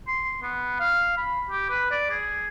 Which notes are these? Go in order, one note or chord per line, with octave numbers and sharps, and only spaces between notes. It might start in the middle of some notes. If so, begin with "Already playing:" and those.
C6
B3
F5
B5
G4
B4
D5
G#4